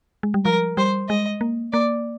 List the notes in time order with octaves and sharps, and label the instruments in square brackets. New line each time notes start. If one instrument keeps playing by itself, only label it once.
[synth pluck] G#3
G3
[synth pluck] F3 [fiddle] A#4
[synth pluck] G3 [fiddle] C5
[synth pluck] G#3 [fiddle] D#5
[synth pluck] A#3
[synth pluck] A#3 [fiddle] D5